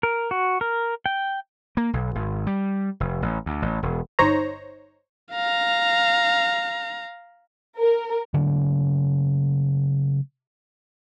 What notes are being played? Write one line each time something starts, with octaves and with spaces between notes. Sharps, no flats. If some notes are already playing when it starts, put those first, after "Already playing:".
A#4
F#4
A#4
G5
A#3
B1
G#1
G3
F1
A1
D2
A1
E1
G1 D#4 C5 C#5 A#5
F5 A#5
A#4
C#3 F#3 A3 A#3